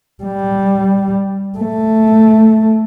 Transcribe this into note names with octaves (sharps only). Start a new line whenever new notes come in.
G3
A3